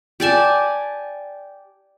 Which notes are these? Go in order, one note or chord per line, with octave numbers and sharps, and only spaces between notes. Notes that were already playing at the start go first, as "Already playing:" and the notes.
G4 D5 G#5 A5